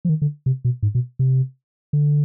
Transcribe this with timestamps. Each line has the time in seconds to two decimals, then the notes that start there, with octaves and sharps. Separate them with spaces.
0.05 F3
0.09 D#3
0.22 D3
0.46 C3
0.65 B2
0.83 G#2
0.95 B2
1.19 C3
1.93 D3